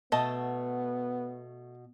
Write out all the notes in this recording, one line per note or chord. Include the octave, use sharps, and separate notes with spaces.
B2 A3 B3 D#5 A5